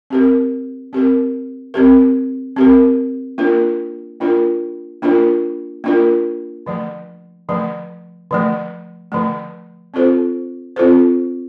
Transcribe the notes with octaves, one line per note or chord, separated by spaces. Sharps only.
C4 G4 A#4
C4 G4 A#4
C4 G4 A#4
C4 G4 A#4
A#3 D4 F4 A#4
A#3 D4 F4 A#4
A#3 D4 F4 A#4
A#3 D4 F4 A#4
D3 F3 A3
D3 F3 A3
D3 F3 A3
D3 F3 A3
C4 F4 A4 C5
C4 F4 A4 C5